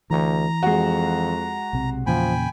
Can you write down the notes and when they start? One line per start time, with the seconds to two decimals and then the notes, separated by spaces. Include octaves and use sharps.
0.10 D2 E3 A#5
0.63 F2 G#3 F#4
1.73 B1 C3
2.07 E2 A#2 C#3 F3 G5 G#5 B5